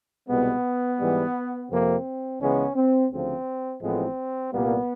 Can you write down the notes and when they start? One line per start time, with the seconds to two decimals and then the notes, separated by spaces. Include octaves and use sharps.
0.29 C2 B2 G#3 B3
0.99 G#2 E3 G3
1.70 F2 C3 F3 A#3 C4
2.40 C#2 C#3 E3 G#3 B3 C#4
2.76 C4
3.11 D2 C#3 F3 C4
3.81 A1 A2 F3 G#3 B3 C4
4.52 C2 A#2 G3 A#3 B3